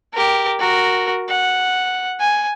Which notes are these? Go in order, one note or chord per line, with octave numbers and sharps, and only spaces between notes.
G4 A#4
F#4 A#4
F#5
G#5